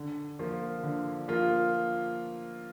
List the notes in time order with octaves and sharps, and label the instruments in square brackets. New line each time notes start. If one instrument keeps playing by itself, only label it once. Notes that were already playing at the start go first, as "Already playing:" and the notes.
Already playing: [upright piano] D3
F3 A#3 F4
D3
F3 A#3 F4